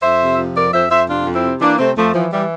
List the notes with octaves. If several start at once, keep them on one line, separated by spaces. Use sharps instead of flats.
F2 C5 E5
C3
F3
F2 A#4 D5
F2 C5 E5
F2 C5 E5
C3 D4 F4
F2
C4 E4
C3
E3 A#3 D4
C3 A3 C4
F2 F3 A3
E3 F3
E3 G3